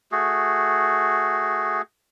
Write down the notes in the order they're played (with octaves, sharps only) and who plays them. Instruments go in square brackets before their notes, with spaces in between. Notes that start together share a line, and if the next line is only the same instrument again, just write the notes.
[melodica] A3 F#4 G#4